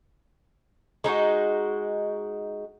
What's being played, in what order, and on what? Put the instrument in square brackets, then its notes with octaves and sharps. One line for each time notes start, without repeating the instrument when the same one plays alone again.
[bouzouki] G#3 D#4 E4 F#4